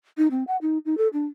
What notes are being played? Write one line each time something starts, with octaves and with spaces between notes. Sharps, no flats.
D#4
C4
F#5
D#4
D#4
A4
D4